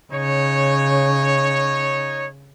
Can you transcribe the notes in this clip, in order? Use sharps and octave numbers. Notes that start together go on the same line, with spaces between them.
C#3 D#4 C#5